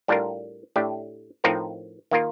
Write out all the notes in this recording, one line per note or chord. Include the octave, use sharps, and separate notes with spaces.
A2 G3 D4 F4 A#4
A2 A3 D4 G4
A2 F3 C4 D#4 A#4
D#3 A#3 F4 A#4